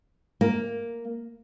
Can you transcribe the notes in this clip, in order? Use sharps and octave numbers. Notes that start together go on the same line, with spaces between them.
A#3